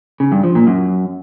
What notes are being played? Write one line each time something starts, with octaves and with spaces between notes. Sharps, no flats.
C#3
G2
F3
A#2
F#2